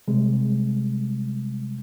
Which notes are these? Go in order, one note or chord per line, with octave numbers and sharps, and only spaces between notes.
C3 G3 G#3